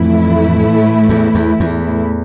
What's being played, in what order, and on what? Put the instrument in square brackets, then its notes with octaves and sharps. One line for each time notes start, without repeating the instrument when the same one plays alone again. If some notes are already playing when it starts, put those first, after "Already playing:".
Already playing: [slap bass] F2 [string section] A2 E3 A3 E4
[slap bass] E2
E2
E2